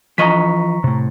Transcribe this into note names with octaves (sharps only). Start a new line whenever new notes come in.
E3 F3 D#5 A#5 C#6 B6
A2 C3